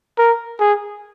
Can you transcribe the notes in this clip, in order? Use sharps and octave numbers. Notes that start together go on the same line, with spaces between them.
A#4
G#4